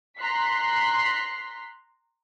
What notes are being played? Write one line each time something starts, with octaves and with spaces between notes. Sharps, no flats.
A#5 C6 F#6 B6 C7